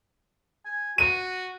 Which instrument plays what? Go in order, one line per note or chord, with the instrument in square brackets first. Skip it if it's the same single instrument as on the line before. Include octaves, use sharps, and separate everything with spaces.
[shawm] G#5
[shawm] F#4 [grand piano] D#7